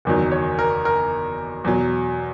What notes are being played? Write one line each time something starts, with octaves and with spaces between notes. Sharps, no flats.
F#1 E2 D#3 F#3
C#5
A#4
A#4
E2 B2 F#3